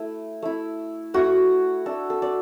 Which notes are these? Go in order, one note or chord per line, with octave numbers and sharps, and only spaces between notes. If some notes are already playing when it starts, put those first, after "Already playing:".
Already playing: A3 E4
A3 E4
A3 E4 F#4
A3 D4 A4
A4
D5